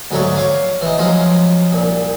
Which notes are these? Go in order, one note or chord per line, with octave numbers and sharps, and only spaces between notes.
D2 G#2 F#3 A3 C#5
C#5 F5 D6 D#6
E3 D#4
F3 F#3 G#3 D#4 F4
C2 A#2